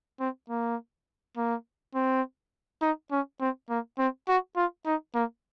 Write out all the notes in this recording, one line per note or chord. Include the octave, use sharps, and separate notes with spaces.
C4
A#3
A#3
C4
D#4
C#4
C4
A#3
C4
F#4
F4
D#4
A#3